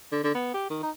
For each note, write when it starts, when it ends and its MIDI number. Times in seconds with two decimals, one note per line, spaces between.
0.12 0.22 50
0.23 0.34 50
0.35 0.50 59
0.54 0.68 67
0.70 0.81 51
0.83 0.90 63